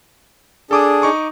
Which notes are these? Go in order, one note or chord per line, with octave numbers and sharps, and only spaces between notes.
D4 G#4 A4 D6 D#6
D#4 C#6 D6